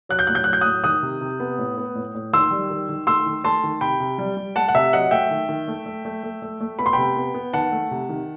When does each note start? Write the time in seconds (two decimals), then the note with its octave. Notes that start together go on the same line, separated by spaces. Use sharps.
0.09 F#3 F#6
0.19 G6
0.27 A2 F#6
0.35 G6
0.44 F#3 F#6
0.53 G6
0.61 A2 D#6 F#6
0.84 D#3 D#6 F#6
1.02 C3
1.21 C3
1.40 B3
1.58 A2
1.78 B3
1.95 A2
2.14 A2
2.33 D#3 C6 E6
2.51 G3
2.70 D#3
2.89 D#3
3.07 A3 C6 E6
3.26 D#3
3.44 A3 A5 C6
3.64 D#3
3.81 C3 G5 B5
4.00 C3
4.18 G3
4.37 G3
4.55 A3 F#5 A5
4.69 F#5
4.74 C3 E5
4.93 F#3 D#5 F#5
5.11 A3 E5 G5
5.31 D#3
5.49 D#3
5.68 A3
5.86 A3
6.05 A3
6.23 A3
6.42 A3
6.60 A3
6.79 B3 B5
6.86 C6
6.93 C3 G5 B5
7.17 B3
7.34 B3
7.53 D#3 F#5 A5
7.72 A3
7.91 C3
8.09 D#3